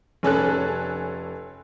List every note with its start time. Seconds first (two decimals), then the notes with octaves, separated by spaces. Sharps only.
0.23 F1 C#4 A4 F#6